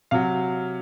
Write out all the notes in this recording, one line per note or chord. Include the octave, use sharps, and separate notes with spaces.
C3 F#3 F5